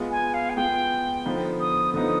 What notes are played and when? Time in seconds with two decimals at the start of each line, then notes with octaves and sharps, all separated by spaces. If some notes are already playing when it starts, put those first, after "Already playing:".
Already playing: G#3 B3 F4
0.11 G#5
0.34 F5
0.50 G#5
0.56 G#3 B3 F4 G5
1.25 D3 F3 B3 D#4
1.60 D#6
1.94 D3 F3 B3 D#4 D#6